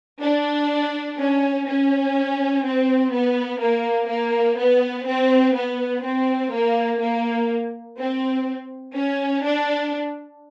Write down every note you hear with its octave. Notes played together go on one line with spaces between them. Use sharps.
D4
C#4
C#4
C4
B3
A#3
A#3
B3
C4
B3
C4
A#3
A#3
C4
C#4
D4